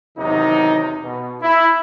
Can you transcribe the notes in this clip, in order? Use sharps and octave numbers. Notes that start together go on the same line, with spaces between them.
E2 C3 D#3 F#3 D#4
B2
E4